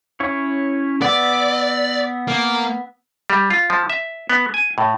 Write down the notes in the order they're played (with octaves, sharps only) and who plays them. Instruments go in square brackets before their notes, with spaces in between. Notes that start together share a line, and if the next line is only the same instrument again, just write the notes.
[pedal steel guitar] C#4 E4 C#5
[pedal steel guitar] B3 E5 [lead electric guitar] D5
[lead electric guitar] A#3
[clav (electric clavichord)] G3
F4
F3
E5
B3
G#5
A2